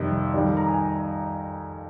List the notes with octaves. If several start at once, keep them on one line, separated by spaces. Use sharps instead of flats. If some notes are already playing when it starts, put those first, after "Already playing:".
Already playing: F2 C3 D#3 G3
F2 D#3 G3
A#5
G#5